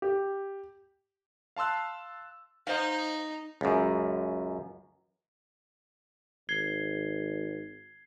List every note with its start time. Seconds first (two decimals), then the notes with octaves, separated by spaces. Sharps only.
0.02 G4
1.56 F5 A5 C6 E6 F#6
2.67 D#4 C5 F5
3.61 C#2 F#2
6.49 G#1 G#6 C7 G7